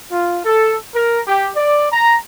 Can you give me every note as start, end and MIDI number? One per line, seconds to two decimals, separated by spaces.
0.10 0.39 65
0.45 0.76 69
0.93 1.19 70
1.26 1.51 67
1.56 1.86 74
1.92 2.16 82